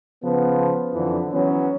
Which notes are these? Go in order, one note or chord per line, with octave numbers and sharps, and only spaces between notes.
C#3 F3 B3
F2 D3 E3 F3
E3 F#3 B3 C#4